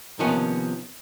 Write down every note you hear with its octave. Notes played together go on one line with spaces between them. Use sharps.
C3 D#3 F3 A#3 B3 C#4